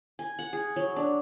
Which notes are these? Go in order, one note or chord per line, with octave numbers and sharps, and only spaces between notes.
G#5
F#5
G#4
F#3
D4